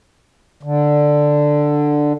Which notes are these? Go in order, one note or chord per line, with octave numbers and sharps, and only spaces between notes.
D3